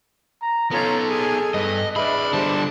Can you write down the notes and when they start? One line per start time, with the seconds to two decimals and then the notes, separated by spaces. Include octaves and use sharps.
0.42 A#5
0.71 B3 C#4 D#4 F4 A4 A#5
1.08 G#4 G#5
1.54 G2 B4 D#5
1.96 D4 G#4 B4 E5 B5
2.33 D3 G3 C5 A5